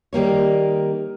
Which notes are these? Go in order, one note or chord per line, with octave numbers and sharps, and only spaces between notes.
D#3 G3 A#3 C#5